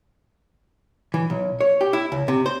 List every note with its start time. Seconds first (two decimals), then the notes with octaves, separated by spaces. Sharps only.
1.14 E3
1.30 B1
1.61 C#5
1.81 G4
1.93 E4
2.12 C#2
2.28 C3
2.46 C5